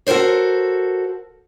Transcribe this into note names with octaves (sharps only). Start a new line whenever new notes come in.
F#4 A4 A#4 C5 C#5